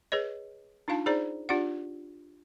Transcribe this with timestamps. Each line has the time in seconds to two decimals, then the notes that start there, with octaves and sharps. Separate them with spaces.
0.12 G#4 B4 C#5 D#5
0.88 D4 D#4 F4 F5 A5
1.06 D#4 G#4 C5 D5 A#5
1.49 D4 F4 G4 D5 F#5